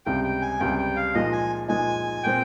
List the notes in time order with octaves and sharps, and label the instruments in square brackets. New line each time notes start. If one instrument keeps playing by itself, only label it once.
[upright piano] C#2 C3 G3 [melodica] G5
[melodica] G5
G#5
[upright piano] C#2 C3 G3 [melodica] G5
[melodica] G5
F5
[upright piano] A#2 F3 G#3 D#4 [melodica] D#5
[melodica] G#5
[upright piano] A#2 F3 G#3 D#4 [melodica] G#5
[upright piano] A#2 G#3 C4 [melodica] G5